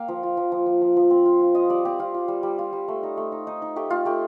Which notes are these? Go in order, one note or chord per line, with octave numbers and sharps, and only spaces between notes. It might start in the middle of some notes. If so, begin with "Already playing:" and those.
Already playing: A#3 F5 G5
F3
F4
F3
F3
F3
F3
F3
C4
F4
F4
F4 D#5
G3 D5
C4 G4
C4 F4
F4
G3
G3
F4
G3
A3
D#4
A3
D#4
D#4
D#4
A3 G4
A3 F4
A3 G4